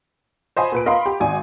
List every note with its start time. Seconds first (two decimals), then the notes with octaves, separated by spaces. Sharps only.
0.56 C5 D#5 G#5 A5 B5
0.72 A#2 B4 D7
0.86 A#4 D#5 F5 B5 C6
1.06 G4
1.20 G#1 D5 G#5